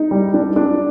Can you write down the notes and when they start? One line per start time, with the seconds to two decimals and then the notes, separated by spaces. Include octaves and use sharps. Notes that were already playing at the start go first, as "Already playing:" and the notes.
Already playing: D#4
0.11 G3
0.34 D4
0.56 D4